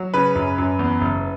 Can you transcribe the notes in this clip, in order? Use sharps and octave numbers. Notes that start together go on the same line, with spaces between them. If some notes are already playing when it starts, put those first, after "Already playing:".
Already playing: F#3
C#3 B4
F#2
F#2
E2
F#1